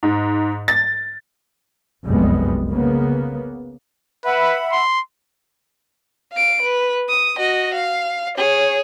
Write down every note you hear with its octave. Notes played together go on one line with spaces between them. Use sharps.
G#2
A6
F1 C2 F#2 G3 G#3 B3
C#3 A#3 B3
B4 E5 F#5 B5
C6
F5 D7
B4
D#6
F#4 D#5
F5
G#4 C#5